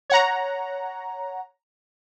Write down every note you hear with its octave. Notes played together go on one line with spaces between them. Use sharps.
C#5 F#5 A#5